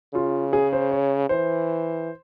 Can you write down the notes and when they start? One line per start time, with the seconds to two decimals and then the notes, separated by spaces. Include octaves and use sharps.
0.14 C#3 F4
0.53 G#4
0.73 C5
0.91 C#5
1.29 E3 C5